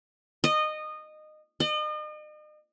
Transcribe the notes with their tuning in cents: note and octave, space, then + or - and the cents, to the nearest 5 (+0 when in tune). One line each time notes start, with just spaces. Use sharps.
D#5 -20
D#5 -40